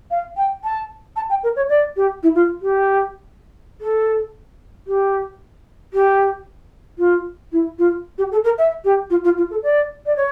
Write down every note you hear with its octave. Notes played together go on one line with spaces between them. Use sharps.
F5
G5
A5
A5
G5
A#4
C#5
D5
G4
E4
F4
G4
A4
G4
G4
F4
E4
F4
G4
A4
A#4
E5
G4
F4
F4
F4
A4
D5
D5
C#5